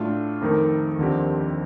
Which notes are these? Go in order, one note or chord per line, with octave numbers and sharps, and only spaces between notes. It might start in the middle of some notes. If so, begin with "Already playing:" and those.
Already playing: A2 A3 D4 F4
F2 D#3 A3 D#4 A#4
D#2 D3 F3 C4 G4